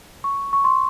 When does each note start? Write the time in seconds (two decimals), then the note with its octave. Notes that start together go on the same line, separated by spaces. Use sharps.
0.24 C#6
0.53 C#6
0.64 C6